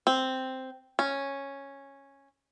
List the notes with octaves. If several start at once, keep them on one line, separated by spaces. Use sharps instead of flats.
C4
C#4